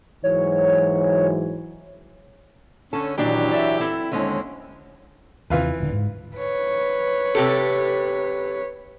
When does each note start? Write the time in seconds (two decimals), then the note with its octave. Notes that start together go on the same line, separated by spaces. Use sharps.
0.24 G#2 E3 F#3 C#5
2.93 D3 C#4 A4
3.17 A#2 D#3 E3 F#3 D4 G4
3.51 D5 E5
3.80 C4 E4 A4
4.12 D#2 D3 G#3 C4 C#4
5.50 D#2 C3 E3 F4 B4
5.80 D#1 D3
5.92 G#2
6.37 B4 C#5
7.35 C3 G4 A4